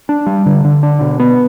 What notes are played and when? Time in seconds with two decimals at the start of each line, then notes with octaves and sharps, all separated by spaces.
0.09 D4
0.27 G3
0.46 D3
0.65 D3
0.83 D4
1.01 B2
1.20 B3